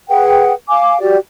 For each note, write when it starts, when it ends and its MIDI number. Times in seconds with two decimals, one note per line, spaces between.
0.09 0.53 68
0.09 0.53 71
0.09 0.53 78
0.09 0.53 79
0.69 0.99 77
0.69 0.99 80
0.69 0.99 86
1.00 1.17 66
1.00 1.17 67
1.00 1.17 74